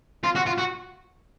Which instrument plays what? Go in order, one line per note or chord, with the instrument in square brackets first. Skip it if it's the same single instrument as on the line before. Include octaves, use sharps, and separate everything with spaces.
[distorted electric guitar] F4
F#4
F4
F#4